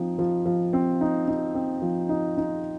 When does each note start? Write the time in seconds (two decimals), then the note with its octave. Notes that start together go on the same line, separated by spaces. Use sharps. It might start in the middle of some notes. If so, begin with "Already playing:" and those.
Already playing: F3 C4 D#4
0.19 F3
0.46 F3
0.73 C4
1.01 D#4
1.28 D#4
1.55 C4
1.82 F3
2.09 D#4
2.37 D#4